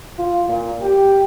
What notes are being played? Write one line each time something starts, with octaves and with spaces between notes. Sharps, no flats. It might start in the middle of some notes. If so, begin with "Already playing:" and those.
F4
A#2
G4